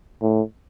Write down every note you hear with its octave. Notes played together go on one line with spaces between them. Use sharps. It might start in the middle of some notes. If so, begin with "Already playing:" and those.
A2